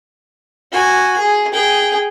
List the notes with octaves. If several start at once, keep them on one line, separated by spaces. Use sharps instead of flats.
F#4 G#5
G#4
G#4 G5